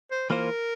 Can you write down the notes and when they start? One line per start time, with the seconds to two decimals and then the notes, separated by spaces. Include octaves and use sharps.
0.11 C5
0.30 E3 A#3 F4 A#4 C5